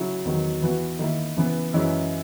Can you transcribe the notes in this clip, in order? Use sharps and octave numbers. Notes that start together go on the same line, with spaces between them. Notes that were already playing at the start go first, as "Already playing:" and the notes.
Already playing: C#3 F#3 C#4 E4
E2 D#3 F#3
E3 B3 F#4
D#3 A#3 E4
C#3 E3 B3
F#2 E3 G#3 C#4 E4